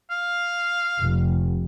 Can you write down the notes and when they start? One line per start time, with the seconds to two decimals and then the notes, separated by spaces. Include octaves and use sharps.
0.11 F5
1.01 F1